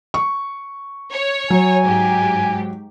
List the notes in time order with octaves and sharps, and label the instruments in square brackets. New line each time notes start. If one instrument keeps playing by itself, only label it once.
[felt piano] C#6
[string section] C#5
[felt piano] F#3 [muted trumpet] G#5
[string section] G#2 G4